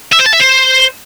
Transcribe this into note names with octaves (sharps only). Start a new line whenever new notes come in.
E5
C5
A5
E5
C5